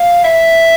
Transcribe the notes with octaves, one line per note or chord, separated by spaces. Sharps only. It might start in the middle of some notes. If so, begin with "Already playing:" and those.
Already playing: F5
E5